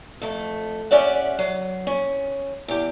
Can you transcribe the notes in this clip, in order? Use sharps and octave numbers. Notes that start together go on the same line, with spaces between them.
F2 A3
C#4 G4 D5 E5 F#5
F#3
C#4
E2 G4